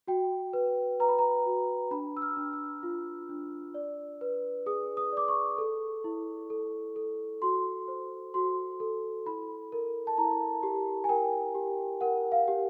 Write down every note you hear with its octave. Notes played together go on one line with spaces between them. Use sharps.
F#4 G5
B4
B4 A#5
B5
A#5
F#4
D4 B5
E6
F6
D4
E6
F4
D4
D5
B4
G#4 D#6
D#6
D5 D6
C#6
A4
E4
A4
A4
F#4 C6
C5
F#4 C6
A4
E4 B5
A#4
A5
E4 A#5
G4
G#5
A#4 G5
G4
A#4 F#5
F5
G4